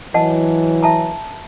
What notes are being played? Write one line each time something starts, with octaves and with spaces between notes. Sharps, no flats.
E3 F#3 D#5 F#5 A5
E5 A5 A#5